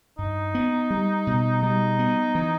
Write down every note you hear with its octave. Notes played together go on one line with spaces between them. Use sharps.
G2 D#4
B3
G3
B2
G3 D#4
B3
E3